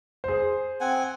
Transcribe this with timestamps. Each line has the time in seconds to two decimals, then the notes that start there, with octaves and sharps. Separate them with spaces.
0.24 G#4 C5
0.81 C4 F#5 G#5